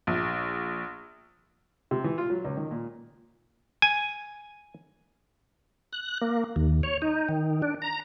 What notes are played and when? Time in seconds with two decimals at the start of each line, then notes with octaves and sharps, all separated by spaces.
0.07 A#1
1.91 C3
2.04 E3
2.18 F4
2.30 F#3
2.44 C#2
2.57 D#3
2.71 A#2
3.82 G#5
5.93 F#6
6.22 A#3
6.56 D#2
6.83 C#5
7.02 D#4
7.29 D#3
7.62 D4
7.82 A#5